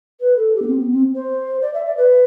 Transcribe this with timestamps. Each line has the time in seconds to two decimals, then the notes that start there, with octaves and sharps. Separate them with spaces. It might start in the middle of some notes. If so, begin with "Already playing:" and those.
0.20 B4
0.37 A4
0.55 G4
0.62 B3
0.67 C4
0.79 B3
0.91 C4
1.15 C5
1.62 D5
1.74 E5
1.85 D5
1.97 B4